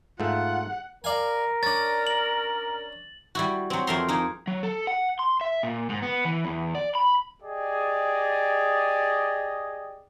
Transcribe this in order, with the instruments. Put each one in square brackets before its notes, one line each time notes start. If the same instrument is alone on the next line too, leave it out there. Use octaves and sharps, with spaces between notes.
[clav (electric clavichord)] G#2 A3 [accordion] F4 [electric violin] F#5
[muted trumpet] A#4 [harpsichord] D5 F5 G#5
[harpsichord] C#4 D4 [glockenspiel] A6
[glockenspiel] F#7
[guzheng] G3 E4 F#4
F#3 C4
F2 A3 A#4 E5 A#5 C6
A#3 D#4 G#4
[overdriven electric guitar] F#3
A4
F#5
C6
E5
A#2
G#2
B3
E3
E2
D5
B5
[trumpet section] G4 G#4 D5 D#5